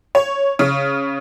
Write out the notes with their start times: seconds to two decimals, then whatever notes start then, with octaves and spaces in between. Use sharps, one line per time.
0.15 C#5
0.59 C#3